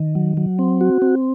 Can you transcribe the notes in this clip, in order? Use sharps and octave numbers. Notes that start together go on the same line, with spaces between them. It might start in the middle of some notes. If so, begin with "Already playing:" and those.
Already playing: D#3
F#3
F#3
C4
F#4
C4